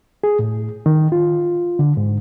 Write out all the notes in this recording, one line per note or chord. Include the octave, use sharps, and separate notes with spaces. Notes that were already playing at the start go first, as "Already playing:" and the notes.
G#4
A2
D#3
F4
D3
G#2